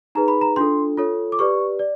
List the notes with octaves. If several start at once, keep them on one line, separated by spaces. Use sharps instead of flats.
D#4 G#4 B4 A#5
B5
A#5
D4 F4 A4 C6
F4 A4 C#5
D6
G4 B4 D5 C#6
D5